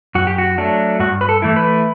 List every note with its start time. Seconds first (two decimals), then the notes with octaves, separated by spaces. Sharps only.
0.15 F#2 F#4
0.27 G4
0.38 F#4
0.58 F#3 A3 D4
1.00 G2 F#4
1.21 B4
1.29 A4
1.42 E3 A3 E4
1.56 B4